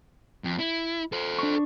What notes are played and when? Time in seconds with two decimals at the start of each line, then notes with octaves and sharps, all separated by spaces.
0.44 F2
0.59 E4
1.12 A4 C5
1.39 D4 C#6